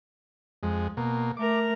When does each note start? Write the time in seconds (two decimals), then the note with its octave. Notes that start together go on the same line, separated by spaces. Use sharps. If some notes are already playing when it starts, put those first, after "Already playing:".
0.63 F2 G#3
0.97 B2 A#3
1.37 A3 A#4 D6